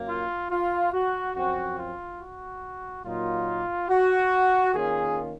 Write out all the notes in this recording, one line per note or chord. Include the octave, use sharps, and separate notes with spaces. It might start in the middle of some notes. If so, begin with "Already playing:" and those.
Already playing: F#2 A#3
F4
F4
F#4
F#2 F3 C4 F#4
F4
F#4
A#2 F#3 A#3 D#4 F4
F#4
D#3 A#3 C#4 F4 G#4